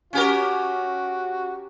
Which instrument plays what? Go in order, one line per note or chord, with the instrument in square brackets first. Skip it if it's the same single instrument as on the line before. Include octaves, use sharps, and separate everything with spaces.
[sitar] C#4 G4 A#4 [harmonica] F#4